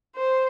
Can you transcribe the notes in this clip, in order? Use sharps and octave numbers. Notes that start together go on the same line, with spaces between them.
C5